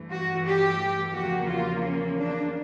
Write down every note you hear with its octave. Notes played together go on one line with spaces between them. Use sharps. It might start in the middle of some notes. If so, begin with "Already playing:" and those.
Already playing: G2 E3 A3
F#4
G4
E2 C#3 F3 A#3 F#4
F4
C#4
D4